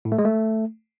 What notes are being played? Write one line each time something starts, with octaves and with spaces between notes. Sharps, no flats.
A2
A3
G#3
A3